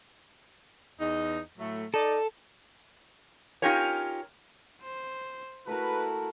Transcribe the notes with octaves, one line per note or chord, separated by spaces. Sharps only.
E2 D#4
A2 F#3 A3
D#4 A4 D5
C#4 D#4 F4 G4 A#4 C#5
C5
A3 E4 F#4 A#4 B4